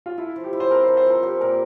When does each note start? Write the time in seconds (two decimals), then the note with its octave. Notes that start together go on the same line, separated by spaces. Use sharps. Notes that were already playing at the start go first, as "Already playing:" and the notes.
0.06 F4
0.18 E4 A4
0.36 F3
0.44 G4
0.53 E4
0.60 C5
0.71 C4 A#4
0.84 A4 C5
0.97 C5
1.06 F3 A#4
1.23 G4 C5
1.41 A#2 A#4